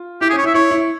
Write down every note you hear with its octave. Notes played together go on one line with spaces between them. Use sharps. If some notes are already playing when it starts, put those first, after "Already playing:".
Already playing: F4
E4 G4
G#4
C#4
C#5
E4
E5
E4 C#5
E4